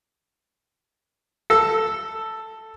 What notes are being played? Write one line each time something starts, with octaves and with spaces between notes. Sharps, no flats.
A4 E6